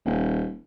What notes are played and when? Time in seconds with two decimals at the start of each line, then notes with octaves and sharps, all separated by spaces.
0.05 D#1